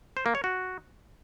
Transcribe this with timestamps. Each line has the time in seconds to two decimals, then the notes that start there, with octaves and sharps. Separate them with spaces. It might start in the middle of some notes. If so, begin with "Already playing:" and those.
0.17 C5
0.26 A#3
0.35 C#5
0.44 F#4